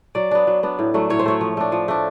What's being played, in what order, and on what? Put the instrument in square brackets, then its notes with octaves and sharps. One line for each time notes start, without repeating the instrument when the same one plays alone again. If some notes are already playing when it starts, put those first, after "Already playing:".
[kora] F#3 D5
B3 D4
F#3
B3 D4
A2
F#3 A3
A2 C#5
C5
F#3 A3 C#5
F3
A3 D4
F3
A3 D4